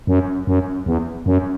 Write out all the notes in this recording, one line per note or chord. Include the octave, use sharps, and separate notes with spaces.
F#2
F#2
E2
F#2